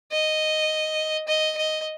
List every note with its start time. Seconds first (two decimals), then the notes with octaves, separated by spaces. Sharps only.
0.12 D#5
1.28 D#5
1.57 D#5